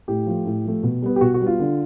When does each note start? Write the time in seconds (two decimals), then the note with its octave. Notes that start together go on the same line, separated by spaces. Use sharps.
0.08 A2 G4
0.26 F3 A3
0.46 A2
0.65 F3 A3
0.83 B2
1.02 G3 B3
1.16 G4
1.21 B2 F#4
1.34 F#4
1.40 G3 B3
1.47 F4
1.59 D3